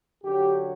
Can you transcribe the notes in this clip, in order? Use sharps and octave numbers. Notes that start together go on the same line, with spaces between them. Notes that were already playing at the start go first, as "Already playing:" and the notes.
F#2 D3 F#3 G4